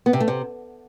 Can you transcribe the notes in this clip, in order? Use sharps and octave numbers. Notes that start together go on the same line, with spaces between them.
B3
C3
A3
C3